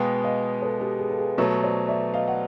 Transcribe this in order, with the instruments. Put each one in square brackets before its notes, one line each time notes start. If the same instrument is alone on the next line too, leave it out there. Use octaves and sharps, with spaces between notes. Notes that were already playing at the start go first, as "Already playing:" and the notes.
Already playing: [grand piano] B2 G#3 B3 [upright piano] F5 G5
[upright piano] D#5 F5
A4 B4
G4 A4
G#4
A4
G#4
[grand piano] B2 F#3 A3 [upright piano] B4 C#5
[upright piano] C5 D5
D5 E5
D#5 F5
F#5